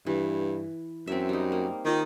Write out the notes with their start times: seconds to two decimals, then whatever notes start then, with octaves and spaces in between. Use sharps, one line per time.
0.07 G2 E3
1.07 F#2 C4 E5
1.29 G3 D#4
1.52 A#3
1.85 D#3 D#4 F4 G4